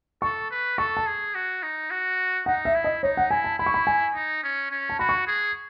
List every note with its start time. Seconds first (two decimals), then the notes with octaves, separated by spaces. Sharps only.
0.22 A4 C#6
0.51 B4
0.78 A4 C#6
0.97 A5
1.07 G#4
1.35 F#4
1.63 D#4
1.91 F#4
2.46 D#4 F#5
2.65 E5
2.75 E4
2.84 D#5
3.03 D#4 C#5
3.17 F#5
3.31 E4 G#5
3.44 A5
3.59 E4 B5
3.66 C#6
3.74 B5
3.87 G#5
4.15 D#4
4.44 C#4
4.71 C#4
4.90 A5
4.99 F#4 B5
5.09 C#6
5.27 G#4